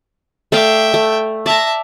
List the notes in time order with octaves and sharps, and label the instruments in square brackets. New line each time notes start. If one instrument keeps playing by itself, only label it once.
[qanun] A3 D5 F5 [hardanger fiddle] E5 G5
[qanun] A3
[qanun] D5 A#5 [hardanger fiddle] E5 A5